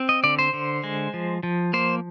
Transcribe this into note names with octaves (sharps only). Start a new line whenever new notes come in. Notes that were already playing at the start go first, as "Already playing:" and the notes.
Already playing: C4
D#5
D3 D5
C5
D3
G#3
F3
F3
A#3 C5